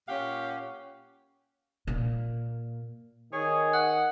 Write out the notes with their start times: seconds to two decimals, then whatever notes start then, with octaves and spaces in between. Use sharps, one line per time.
0.08 A#2 C#4 G4 F5 F#5
1.87 A#2
3.33 D#3 G#4 C#5
3.73 F#5 F#6